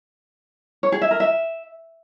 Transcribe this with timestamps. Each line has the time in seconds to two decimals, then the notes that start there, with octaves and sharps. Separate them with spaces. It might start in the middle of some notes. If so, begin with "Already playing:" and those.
0.83 C#5
0.92 G#4
1.02 E5
1.11 A#4
1.20 E5